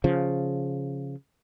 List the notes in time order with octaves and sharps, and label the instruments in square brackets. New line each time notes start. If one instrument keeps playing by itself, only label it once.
[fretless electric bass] C#3 F3